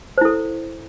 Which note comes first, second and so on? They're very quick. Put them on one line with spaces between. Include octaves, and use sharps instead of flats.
C5 E4 A4